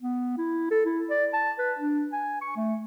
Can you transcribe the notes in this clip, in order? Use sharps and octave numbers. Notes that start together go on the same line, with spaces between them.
B3
E4
A4
E4
D5
A5
B4
D4
G#5
C#6
A3